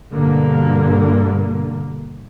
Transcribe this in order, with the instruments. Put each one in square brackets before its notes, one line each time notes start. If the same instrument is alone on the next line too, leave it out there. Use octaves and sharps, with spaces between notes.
[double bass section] G2 B2 D3 A#3